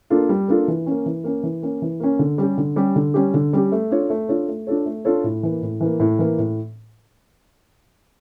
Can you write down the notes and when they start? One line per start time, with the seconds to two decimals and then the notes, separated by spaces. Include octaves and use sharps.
0.10 A#3 D4 F4 A4
0.29 G3
0.48 A#3 D4 F4 A4
0.68 E3
0.86 A#3 C#4
1.06 E3
1.24 A#3 C#4
1.43 E3
1.62 A#3 C#4
1.82 E3
2.00 A#3 C#4
2.19 D3
2.38 G3 C#4 G4
2.58 D3
2.76 G3 C#4 G4
2.96 D3
3.14 G3 C#4 G4
3.34 D3
3.53 G3 C#4 G4
3.72 A3
3.91 D4 F4 A4 C#5
4.10 A3
4.29 D4 F4 A4 C#5
4.48 A3
4.67 D4 F4 A4 C#5
4.86 A3
5.05 D4 F4 A4 C#5
5.24 A2
5.43 E3 A#3
5.62 A2
5.80 E3 A#3
6.00 A2
6.19 E3 A#3
6.38 A2